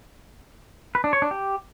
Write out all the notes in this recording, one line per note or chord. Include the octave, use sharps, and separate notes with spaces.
B4
D4
C#5
D4
G4